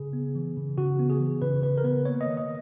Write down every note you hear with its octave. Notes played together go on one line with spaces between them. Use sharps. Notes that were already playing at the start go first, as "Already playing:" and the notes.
Already playing: C#3 G#4
B3
E3
C#3
C#3 F#4
B3
G#4
E3
C#3 B4
C#3 B4
A#4
B3 B4
A#3 C#5
D#5
D#3
D#5